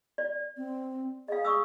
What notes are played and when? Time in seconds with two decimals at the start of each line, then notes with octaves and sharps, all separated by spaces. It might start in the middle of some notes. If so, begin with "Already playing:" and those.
0.18 D5
0.57 C4
1.28 G#4 D#5 F5
1.45 C#6 D#6 E6